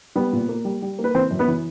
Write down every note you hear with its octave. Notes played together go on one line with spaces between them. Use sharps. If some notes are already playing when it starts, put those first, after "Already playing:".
G3 B3 B4
A#2
A#3
G3
G3
A#3
B4
E3 C4 C5
F#2
B3 B4
E3